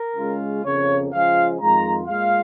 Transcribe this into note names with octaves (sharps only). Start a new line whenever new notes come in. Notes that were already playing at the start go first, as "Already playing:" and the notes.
Already playing: A#4
C#3 G#3 C#4 F4
F2 C#3 A#3 C#5
C#3 F3 G#3 F4 F5
F2 D#3 G#3 F4 A#5
A#2 G#3 F4 F5